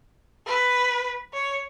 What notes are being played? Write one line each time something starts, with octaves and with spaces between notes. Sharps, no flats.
B4
C#5